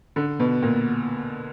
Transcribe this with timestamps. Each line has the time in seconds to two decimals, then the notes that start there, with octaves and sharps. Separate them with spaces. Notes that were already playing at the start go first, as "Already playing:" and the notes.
0.16 D3
0.40 B2
0.62 A#2